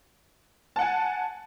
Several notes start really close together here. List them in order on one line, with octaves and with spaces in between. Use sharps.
A5 F#5 G#5